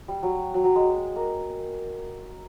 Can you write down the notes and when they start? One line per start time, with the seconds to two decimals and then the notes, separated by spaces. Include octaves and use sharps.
0.08 G3
0.23 F#3
0.54 F#3
0.64 F#3
0.75 G#3
1.16 A#3